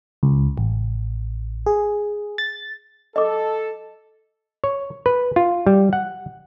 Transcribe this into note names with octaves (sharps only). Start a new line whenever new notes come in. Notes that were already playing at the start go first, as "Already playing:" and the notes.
C#2
A1
G#4
A6
A4 D#5 D6
C#5
B4
F4
G3
F#5